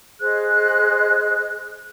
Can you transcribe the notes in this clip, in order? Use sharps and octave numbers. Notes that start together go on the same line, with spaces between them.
G#4 C5 D#5 F#6